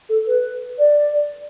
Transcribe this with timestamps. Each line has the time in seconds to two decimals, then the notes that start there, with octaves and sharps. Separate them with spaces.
0.09 A4
0.27 B4
0.78 D5